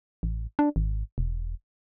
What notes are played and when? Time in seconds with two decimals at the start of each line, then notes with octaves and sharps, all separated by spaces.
0.23 A1
0.59 D4
0.76 G#1
1.18 E1